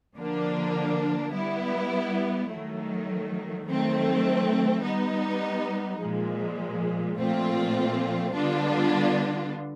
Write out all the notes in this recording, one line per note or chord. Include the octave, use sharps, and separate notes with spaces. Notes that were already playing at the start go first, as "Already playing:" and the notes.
D3 F3 A#3 D4
G3 B3 E4
D#3 F#3 A3
D#3 F#3 A3 C4
G3 B3 D#4
A#2 F3 G#3
A#2 F3 A3 C4 F4
D3 G3 B3 D4 F4